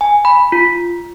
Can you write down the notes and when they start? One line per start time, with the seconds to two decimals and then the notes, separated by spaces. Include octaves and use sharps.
0.01 G#5
0.25 B5
0.52 F4